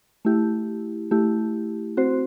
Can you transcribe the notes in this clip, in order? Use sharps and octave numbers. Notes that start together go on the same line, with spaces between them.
A3 E4 G4
A3 E4 G4
C4 F#4 C5